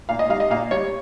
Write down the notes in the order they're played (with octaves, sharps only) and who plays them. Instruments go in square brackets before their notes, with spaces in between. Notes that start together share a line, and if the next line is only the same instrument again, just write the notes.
[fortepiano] A#2 F5
D#5
G3 F5
D#5
A#2 F5
G3 C#5